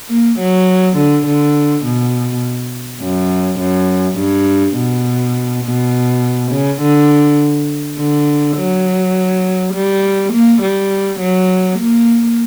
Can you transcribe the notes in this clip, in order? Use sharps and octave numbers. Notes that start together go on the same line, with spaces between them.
A#3
F#3
D3
D3
B2
F#2
F#2
G2
B2
B2
C#3
D3
D3
F#3
G3
A#3
G3
F#3
A#3